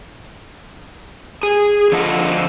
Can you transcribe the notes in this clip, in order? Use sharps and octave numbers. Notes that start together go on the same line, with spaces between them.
G#4
D3 F3 F4 A4 D#5 F#5